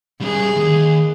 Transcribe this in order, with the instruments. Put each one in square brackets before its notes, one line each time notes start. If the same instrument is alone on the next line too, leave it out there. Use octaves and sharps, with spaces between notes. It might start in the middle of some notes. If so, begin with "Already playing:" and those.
[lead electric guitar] G3 C#4 [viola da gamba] G#4
[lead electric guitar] D#2 D#3